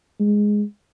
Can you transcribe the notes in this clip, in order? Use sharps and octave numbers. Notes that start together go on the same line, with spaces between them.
G#3